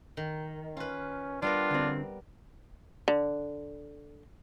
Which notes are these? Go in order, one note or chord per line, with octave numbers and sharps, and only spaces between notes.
D#3
C#4 F4 B4
G3 B3 D4 F4 A#4
D3 C4
D3